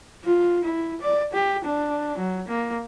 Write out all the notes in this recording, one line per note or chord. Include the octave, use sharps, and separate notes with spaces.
F4
E4
D5
G4
D4
F#3
A#3